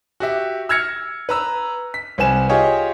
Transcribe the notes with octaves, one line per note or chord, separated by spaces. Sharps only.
F#4 G4 E5
E6 F6 G#6 A#6 C#7
B4 A#5 E6
B6
C2 C4 B4 G#5 E7
F4 G4 G#4 C#5 D#5